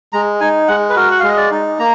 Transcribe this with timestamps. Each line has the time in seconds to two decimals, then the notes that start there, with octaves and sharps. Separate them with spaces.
0.13 G#3 A#5
0.40 D#4 G#5
0.68 G#3 F#5
0.89 B4
0.96 F#4 A#4
1.11 F#5
1.20 G#3 F5
1.29 D#5
1.37 D5
1.51 D#4
1.79 A#3 A#5